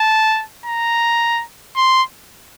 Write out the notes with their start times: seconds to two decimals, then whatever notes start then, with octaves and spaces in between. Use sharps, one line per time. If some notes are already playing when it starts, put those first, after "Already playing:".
Already playing: A5
0.66 A#5
1.76 C6